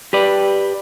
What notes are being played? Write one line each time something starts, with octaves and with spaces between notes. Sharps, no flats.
G4 B4 D5